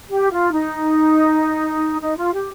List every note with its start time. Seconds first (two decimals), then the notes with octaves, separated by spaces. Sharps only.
0.09 G4
0.31 F4
0.51 D#4
2.01 D#4
2.17 F4
2.33 G4